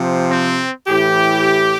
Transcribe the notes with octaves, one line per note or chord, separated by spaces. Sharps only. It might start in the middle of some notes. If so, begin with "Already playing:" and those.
Already playing: C3 F3
C4
A2 E3 G4